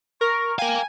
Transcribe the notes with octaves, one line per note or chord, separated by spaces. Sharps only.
A#4 C#6
A#4 F5 G5 G#5